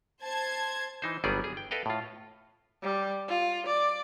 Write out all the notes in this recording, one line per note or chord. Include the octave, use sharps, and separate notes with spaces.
C5 A5 G#6
E3 D#4 C5
G1 F#3 G3 B3 G#4 D5
G#4
G5
A4 B4 D#5 F5 G5
A2 F4
G3
F4
D5